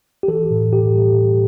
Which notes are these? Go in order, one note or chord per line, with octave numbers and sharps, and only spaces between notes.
G4
E3 A4
A2
A2 G4
G3
A2